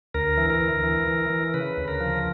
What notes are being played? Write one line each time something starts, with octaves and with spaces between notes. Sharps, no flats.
D2 A#4
E3
A#4
D2
E3
E3
E3
C#3 B4
D2
A#4
F3